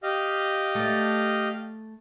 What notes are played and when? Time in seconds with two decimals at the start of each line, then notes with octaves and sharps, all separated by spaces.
0.03 G4 D#5 F5
0.75 A3 D5